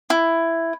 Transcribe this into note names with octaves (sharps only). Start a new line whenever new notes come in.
E4